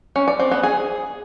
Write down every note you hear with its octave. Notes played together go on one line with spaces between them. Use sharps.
C#4
D5
C4
B3
G#4